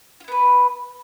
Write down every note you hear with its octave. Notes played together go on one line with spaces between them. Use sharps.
B3 E4 F4 B4